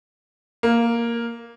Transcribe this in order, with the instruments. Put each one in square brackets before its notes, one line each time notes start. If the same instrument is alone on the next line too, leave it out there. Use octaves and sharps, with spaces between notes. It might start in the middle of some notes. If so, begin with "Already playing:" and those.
[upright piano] A#3